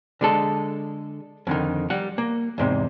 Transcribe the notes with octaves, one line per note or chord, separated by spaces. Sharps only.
D3 G#3 A4
F2 D3 D#3
G3 F#5
A#3
E2 G#2 C3